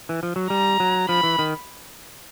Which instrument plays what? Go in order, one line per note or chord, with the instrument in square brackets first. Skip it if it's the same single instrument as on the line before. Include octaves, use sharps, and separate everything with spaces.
[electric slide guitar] E3
F3
F#3
[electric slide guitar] G3 [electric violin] A#5
[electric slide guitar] F#3
[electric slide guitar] F3 [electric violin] B5
[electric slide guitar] E3
D#3